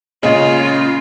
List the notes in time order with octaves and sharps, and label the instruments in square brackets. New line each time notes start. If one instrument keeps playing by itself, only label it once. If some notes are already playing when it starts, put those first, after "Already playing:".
[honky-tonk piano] A#2 G#3 [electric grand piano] C#3 C#4 [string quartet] F4 [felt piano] D#5